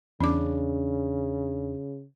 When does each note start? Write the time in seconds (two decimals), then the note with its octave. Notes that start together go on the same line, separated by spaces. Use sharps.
0.21 E2 C#3 C#4 D4 D6